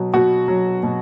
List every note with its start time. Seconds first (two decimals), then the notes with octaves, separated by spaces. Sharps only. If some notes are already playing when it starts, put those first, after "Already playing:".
Already playing: B2 F#3
0.14 B2 F#4
0.48 F#3
0.83 B2